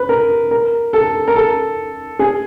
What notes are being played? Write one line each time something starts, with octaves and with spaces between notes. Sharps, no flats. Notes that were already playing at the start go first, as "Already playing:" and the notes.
Already playing: B4
A#4
A#4
A4
A#4
A4
G#4